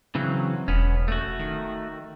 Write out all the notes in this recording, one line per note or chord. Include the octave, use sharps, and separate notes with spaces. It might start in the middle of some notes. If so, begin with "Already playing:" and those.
C#3 E3 F#3 C4
E1 B3 C#4
A3 F#4
D#3